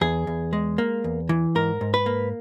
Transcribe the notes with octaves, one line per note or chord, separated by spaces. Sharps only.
E2 G#4
E2
G#3
A#3
E2
E3
G#2 A#4
G#2
B4
A#3